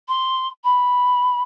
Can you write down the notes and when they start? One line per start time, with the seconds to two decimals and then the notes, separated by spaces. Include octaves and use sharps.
0.08 C6
0.64 B5